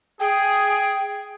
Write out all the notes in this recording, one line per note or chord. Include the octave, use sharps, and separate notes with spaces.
G#4 G5